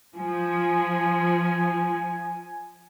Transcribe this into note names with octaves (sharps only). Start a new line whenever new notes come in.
F3 G#5